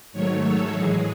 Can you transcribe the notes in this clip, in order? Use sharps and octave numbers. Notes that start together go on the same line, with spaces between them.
G#2 D#3 F#3 A3 C#5
A4
A2 E3 G#3 G#4